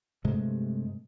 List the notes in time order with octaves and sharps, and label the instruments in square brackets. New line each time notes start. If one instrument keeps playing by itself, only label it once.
[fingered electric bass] G2 C3 G#3 A3